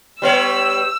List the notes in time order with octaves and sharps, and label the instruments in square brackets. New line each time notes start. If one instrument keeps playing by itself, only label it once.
[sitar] G3 B3 C#5 [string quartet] E6